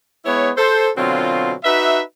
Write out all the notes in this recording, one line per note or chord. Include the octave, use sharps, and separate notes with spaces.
G#3 B3 E4 C#5
A4 C5
B2 D3 F#3 C4 F4
D#4 F#4 B4 E5